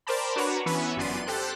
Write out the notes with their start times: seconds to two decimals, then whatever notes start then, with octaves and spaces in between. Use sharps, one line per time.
0.07 A#4 C5 D5 G5 A5 B5
0.36 D4 F#4 B4 C#5 F#5 A#5
0.66 E3 B3 C#4 B4 E5
0.96 G1 F#2 B3 D5 C6 D#7
1.27 G4 A4 C5 F#6